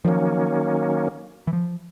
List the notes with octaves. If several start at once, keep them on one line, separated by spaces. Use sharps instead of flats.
D#3 F3 F#3 A#3 C#4
E3
F3